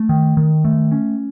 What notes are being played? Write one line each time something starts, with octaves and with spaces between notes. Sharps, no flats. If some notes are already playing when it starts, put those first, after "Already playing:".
Already playing: A3
D#3
D#3
A3
C#4